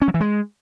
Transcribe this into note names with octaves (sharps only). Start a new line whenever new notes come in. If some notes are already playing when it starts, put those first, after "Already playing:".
C#4
F#3
E3
G#3